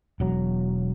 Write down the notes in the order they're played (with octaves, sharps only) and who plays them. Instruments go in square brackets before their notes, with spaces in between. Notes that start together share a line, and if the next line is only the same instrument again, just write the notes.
[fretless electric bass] E1 F#3